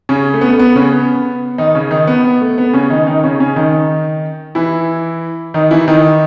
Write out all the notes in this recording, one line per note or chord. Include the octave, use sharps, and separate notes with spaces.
C#3 C#4
A3
B3
A3
B3
C#3 C#4
B3
D#3 D#4
C#3 C#4
D#3 D#4
B3
B3
A3
B3
C#3 C#4
D#3 D#4
D#3 D#4
C#3 C#4
C#3 C#4
D#3 D#4
E3 E4
D#3 D#4
E3 E4
D#3 D#4